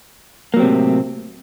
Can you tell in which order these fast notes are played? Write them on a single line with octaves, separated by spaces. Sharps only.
A#3 F#3 C4 C3 A2